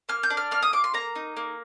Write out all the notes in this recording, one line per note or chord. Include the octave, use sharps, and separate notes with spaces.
A#3 F6
G6
D4
F6
A#3 F6
D#6
F4 D6
C6
A#3 A#5
D#4
A#3